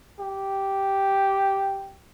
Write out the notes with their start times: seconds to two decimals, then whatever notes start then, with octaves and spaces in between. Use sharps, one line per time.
0.20 G4